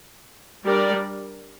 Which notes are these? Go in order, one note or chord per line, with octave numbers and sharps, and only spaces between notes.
G3 D4 A#4 D5